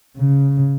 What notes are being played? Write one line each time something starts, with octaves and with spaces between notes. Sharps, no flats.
C#3